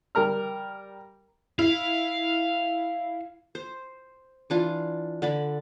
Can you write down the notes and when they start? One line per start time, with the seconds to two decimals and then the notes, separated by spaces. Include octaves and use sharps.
0.15 G3 A#4 A#5 F6
1.59 E4 F5
3.55 C5
4.50 E3 D4 F4
5.22 D3 D5 B5